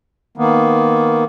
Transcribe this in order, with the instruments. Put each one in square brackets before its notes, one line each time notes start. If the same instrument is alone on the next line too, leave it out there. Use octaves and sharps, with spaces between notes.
[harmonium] D#3 A#3 B3